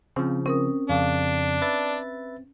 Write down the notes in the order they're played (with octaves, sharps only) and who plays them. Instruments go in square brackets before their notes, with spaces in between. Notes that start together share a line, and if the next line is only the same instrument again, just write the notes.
[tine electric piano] C#3 F3 [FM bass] C4
[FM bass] C4 [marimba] C#4 A#4 D#6
[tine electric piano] F2 C#3 [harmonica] D4 [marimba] F5
[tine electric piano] B4 E5 A6